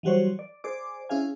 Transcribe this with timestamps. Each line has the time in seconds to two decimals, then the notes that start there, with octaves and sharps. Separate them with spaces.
0.03 E3 F#3 G3 F#4 C5 C#5
0.39 D5
0.64 G#4 C5 D5 D6
1.09 C#4 E4 G#4 F5 G#5